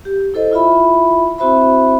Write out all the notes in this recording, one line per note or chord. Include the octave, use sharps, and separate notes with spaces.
G4
E4 A4 C5 D#5
E4 F4 E5 B5
C4 E4 F#4 C5 E5 B5